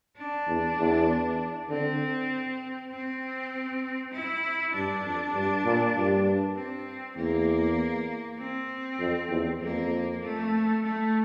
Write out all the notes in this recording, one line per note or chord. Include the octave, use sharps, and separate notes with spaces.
D4
E2
E2
D3 C4
C4
E4
G2 D4
F2
G2
A#2
G2
C4
E2 A#3
C4
F2
E2
F2 A#3
A3
A3